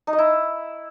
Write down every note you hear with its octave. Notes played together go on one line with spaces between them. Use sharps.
D#4
D#5
E4